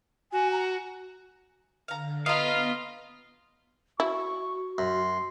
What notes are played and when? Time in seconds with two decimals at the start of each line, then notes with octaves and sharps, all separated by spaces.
0.32 F#4 G#5
0.52 A#5
1.88 D3 F5 A#5
2.26 B3 F4 B4 D#5 F5 A#5 A#6
4.00 E4 F#4 C#6
4.78 F#2 C6